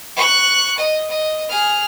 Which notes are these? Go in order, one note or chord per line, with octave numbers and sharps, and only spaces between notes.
C#6 F#6
D#5
D#5
G#4 F6